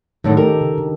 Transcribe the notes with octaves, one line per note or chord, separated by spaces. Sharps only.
F#2 A2 D3 D#3 D#4 A4
G4 A4 A#4
C#3
D3